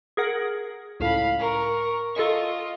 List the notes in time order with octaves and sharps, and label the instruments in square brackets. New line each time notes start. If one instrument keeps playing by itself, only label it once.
[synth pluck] G#4 A#4 F#5
[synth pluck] C#2 A2 [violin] F5 B5
[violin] A#4 C#6
[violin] F4 D#5 [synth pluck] A4 C#6